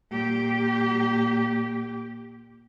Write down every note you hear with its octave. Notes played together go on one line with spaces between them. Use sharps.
A#2 G4